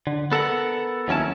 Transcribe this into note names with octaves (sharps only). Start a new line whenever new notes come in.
D3
B3 A4 A#4 F#5
D#2 F#3 C#4 E4 A5